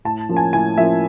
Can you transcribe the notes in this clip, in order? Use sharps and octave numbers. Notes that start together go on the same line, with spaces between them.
A2 A5
F3 A#3 C#4
G#5
A2 G#5
F3 A#3 C#4 E5